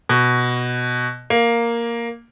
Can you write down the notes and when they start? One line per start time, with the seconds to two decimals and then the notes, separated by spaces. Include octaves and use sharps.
0.09 B2
1.30 A#3